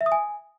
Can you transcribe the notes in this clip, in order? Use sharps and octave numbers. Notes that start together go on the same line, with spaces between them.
E5
D#6
G#5